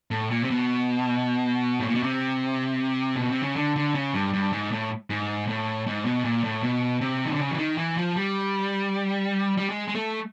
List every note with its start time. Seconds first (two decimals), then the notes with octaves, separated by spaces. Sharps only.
0.11 A2
0.31 A#2
0.43 C3
0.50 B2
1.80 A2
1.87 A#2
1.95 B2
2.03 C3
3.16 B2
3.29 C3
3.43 C#3
3.56 D3
3.76 D3
3.94 C#3
4.14 G2
4.33 G2
4.53 G#2
4.71 A2
5.10 G#2
5.48 A2
5.87 G#2
6.05 B2
6.25 A#2
6.44 A2
6.63 B2
7.01 C3
7.25 D#3
7.32 D3
7.40 C#3
7.51 E3
7.58 D#3
7.78 E3
7.97 F3
8.16 G3
9.58 G3
9.70 G#3
9.88 G#3
9.95 A3